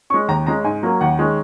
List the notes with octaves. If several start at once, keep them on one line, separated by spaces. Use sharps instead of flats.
G#3 C#4 C#6
D#2 A#5
C#3 G#3 C#4 A#5
G#2 G#5
F#3 A#3 C#4
D#2 F#5
D#3 G#3 C#4